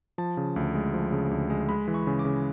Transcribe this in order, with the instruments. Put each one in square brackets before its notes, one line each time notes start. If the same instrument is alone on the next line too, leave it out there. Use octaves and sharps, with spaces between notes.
[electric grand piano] F3 A5
C#3
D2
G#3
F3
C#3
D2
G#3
G#3 B5
E3
C#6
C#3
D6
C#3